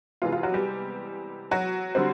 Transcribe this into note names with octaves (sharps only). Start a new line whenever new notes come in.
C3 E3 G#3 B3 F4
F4
F#3 F#4
G3 G4
F#3 F#4
D3 G3 C4